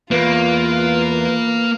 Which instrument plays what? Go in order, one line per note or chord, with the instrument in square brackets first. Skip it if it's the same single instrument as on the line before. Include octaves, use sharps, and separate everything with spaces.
[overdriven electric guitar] E2 [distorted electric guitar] A#3 [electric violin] F4 [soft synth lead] B4